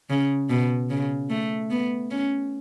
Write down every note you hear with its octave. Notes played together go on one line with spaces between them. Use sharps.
C#3
B2
C#3
A3
B3
C#4